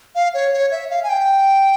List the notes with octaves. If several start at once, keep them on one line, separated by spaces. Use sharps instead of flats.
F5
C#5
C#5
E5
F5
G#5
G5